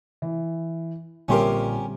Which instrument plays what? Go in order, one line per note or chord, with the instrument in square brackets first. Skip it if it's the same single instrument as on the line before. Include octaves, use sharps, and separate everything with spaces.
[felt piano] E3
[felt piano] A#1 C6 [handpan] D3 G3 C4 [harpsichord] C#4 G4 A#4